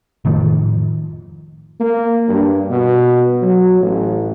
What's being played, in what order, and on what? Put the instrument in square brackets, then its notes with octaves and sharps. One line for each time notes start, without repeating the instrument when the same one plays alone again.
[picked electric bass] F1 A2 D#3 F3
[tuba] A#3
G2
B2
F#3
A1